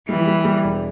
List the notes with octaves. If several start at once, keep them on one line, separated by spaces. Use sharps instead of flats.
E3 G3
G3
G3
E1